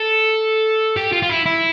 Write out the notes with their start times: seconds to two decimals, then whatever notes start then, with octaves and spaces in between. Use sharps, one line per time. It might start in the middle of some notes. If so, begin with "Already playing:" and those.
Already playing: A4
0.96 G4
1.12 F4
1.22 F4
1.30 E4
1.46 E4